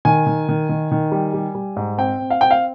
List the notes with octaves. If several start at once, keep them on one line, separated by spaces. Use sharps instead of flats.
D#3 G#5
D#3
D#3
D#3
D#3
G3
G3
G3
G#2
C4 G5
C4
F5
C4 G5
F5